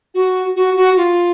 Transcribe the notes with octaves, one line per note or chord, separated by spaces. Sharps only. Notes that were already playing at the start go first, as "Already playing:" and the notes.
F#4
F#4
F#4
F4